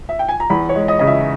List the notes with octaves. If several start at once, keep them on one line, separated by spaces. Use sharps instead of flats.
E5
G5
G#5
A#5
E2 B5
C#5
G#3
D#5
C#3 D#5
E5